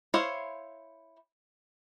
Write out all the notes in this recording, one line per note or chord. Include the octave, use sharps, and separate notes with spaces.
E4 C5 C#5 F5